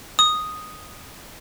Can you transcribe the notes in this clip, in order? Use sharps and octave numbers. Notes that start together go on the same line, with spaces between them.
D#6